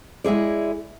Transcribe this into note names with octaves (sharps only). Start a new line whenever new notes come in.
G#3 E4 G#4 D5